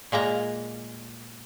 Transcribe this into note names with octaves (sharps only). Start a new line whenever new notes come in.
A#2 G#3 A#3 A#5